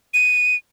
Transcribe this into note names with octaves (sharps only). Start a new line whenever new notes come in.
D#7